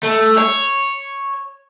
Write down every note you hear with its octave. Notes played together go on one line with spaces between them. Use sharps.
A3
C#5